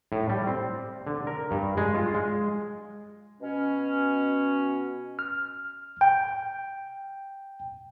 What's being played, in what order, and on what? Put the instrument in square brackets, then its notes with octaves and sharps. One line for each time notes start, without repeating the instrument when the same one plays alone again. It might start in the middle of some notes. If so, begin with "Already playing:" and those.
[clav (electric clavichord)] A2
G3
C4
D3
A#4
G2
G#3
F4
G#3
[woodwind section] B2 C#4
[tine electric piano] F6
G5